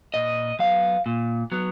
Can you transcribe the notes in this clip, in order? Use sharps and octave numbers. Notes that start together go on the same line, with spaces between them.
A#2 D#5
F#3 B3 F5
A#2
F#3 B3